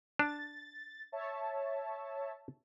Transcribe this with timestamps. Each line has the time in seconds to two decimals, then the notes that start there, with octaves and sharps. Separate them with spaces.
0.19 D4 A6
1.12 C#5 E5 A5